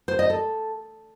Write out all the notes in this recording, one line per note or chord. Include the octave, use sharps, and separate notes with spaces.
C5
D#5
A4